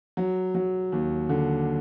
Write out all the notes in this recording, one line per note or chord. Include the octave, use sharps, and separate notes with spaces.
F#3
F#3
D#2
D3